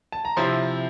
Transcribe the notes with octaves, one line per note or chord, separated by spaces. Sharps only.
A5
A#5
C3 F3 C4 E4 C6